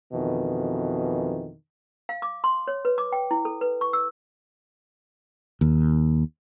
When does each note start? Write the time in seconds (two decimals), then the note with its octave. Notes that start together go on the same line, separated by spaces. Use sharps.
0.13 F2 B2 D#3 E3
2.09 F5
2.22 D6
2.44 C6
2.68 C#5
2.85 B4
2.98 D6
3.12 G5
3.31 E4
3.45 A4
3.61 B4
3.81 C#6
3.93 E6
5.61 D#2